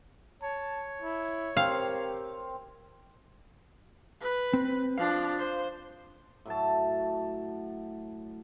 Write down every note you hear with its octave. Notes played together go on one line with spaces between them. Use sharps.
C#5 A5
E4
C4 G4 A#4 F5
B4
C4
F3 D4 F5
C5
A2 F#3 A3 A5